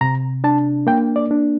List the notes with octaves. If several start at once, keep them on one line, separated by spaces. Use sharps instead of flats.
C3 A#5
D4 A5
A#3 G5
D5
D4